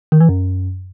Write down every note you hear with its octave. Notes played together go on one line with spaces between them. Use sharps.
D#3
E3
F#2